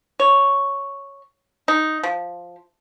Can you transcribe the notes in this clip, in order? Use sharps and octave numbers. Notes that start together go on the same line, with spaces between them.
C#5
D#4
F3